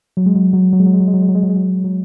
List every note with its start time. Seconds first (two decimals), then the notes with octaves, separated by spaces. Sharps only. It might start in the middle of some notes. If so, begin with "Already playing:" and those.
0.17 F#3
0.26 G#3
0.35 F#3
0.53 F#3
0.73 F#3
0.80 G#3
0.86 F#3
0.94 G#3
1.00 F#3
1.08 G#3
1.14 F#3
1.22 G#3
1.29 F#3
1.35 G#3
1.43 F#3
1.49 G#3
1.56 F#3
1.84 F#3